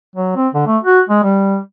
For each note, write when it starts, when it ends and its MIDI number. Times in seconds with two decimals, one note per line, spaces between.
0.16 0.33 54
0.36 0.48 60
0.54 0.65 50
0.67 0.78 57
0.83 1.01 66
1.09 1.21 56
1.23 1.57 55